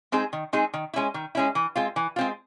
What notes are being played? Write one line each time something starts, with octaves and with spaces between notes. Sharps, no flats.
G#3 C4 D#4 G#4
D#3
G#3 C4 D#4 G#4
D#3
G#3 C#4 E4
D#3
G#3 C#4 E4
E3
G#3 C4 F4
E3
G#3 C4 F4